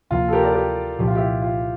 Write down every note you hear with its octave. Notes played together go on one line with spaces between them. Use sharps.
D2 C3 F3 A#3 F4
A4
G4 A#4
A#4 D5
G4 A#4
C2 A#2 F3 G4
F4
E4 G4
F4